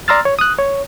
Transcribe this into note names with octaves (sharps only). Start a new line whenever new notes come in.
D5 A#5 C6 E6 F6 A6
C#5
D#6 F#6
C#5